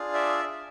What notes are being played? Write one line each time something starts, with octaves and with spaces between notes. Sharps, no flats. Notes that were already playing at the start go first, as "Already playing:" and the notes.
Already playing: D4 F4 G#4
D5 E5